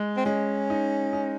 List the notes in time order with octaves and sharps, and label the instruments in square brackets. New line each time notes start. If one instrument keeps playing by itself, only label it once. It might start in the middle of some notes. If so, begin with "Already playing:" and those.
Already playing: [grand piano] G#3
[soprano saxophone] C4
[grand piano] G#3 [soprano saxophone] C#4
[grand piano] D#4
D#4